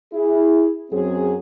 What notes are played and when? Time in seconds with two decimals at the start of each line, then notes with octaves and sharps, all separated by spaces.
0.14 E4 G#4
0.92 F#2 F#3 C4 G#4